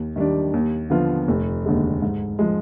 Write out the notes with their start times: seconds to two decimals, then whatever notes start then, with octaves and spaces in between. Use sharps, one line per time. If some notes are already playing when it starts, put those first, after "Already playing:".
Already playing: D#2
0.16 D#3 G3 D4
0.53 D#2
0.90 D3 F3 B3 F4
1.28 F1
1.65 D#2 D3 G#3
2.02 G#2
2.39 F3 G#3